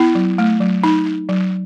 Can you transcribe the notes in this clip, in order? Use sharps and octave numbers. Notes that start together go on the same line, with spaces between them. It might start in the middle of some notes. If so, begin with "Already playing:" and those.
Already playing: B3 E4
F#3
A3
F#3
D#4
D#4
F#3